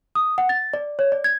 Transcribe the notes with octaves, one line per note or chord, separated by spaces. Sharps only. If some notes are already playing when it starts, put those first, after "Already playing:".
D#6
F#5
A6
D5
C#5
D5
G#6